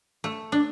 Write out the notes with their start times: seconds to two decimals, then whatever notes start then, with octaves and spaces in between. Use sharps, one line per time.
0.24 A3
0.52 D4